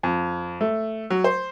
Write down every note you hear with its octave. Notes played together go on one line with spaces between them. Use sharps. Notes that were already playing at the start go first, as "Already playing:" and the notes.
F2
A3
F#3
C5